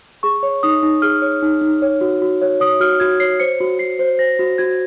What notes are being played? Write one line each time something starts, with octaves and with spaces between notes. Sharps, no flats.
G#4 C#6
C#5
D#4 D#6
D#4
G#4 F6
C#5
D#4
D#4
C#5
F#4
F#4
C#5
C#5 D#6
F#4 F6
F#4 G#6
C#5 C7
C5 C#7
F#4
F#4 C7
C5
C5 A#6
F#4
F#4 G#6